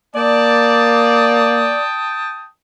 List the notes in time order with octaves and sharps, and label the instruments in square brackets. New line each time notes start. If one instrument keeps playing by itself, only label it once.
[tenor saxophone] A#3 [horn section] D5 [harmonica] G5 A5 D#6